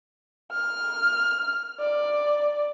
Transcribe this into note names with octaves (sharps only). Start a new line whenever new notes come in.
F6
D5